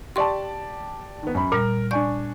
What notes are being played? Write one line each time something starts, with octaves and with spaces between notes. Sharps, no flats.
G4 D5 A5 C6 C#6
D#3 B3
F#2 B5
A#2 G3 A#4
D4 D5 G#5 C#6 G6